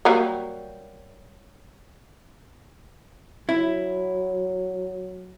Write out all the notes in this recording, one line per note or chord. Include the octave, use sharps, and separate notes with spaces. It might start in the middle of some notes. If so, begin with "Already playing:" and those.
F#3 G3 A#3
F#3 E4